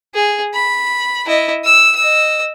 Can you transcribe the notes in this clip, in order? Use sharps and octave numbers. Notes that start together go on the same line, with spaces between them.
G#4
B5
E4 D#5
E6
D#5 E6